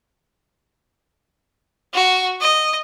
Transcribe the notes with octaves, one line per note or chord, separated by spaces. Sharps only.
F#4
D#5